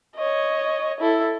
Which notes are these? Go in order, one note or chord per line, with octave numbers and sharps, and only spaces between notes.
C#5 D#5
E4 A4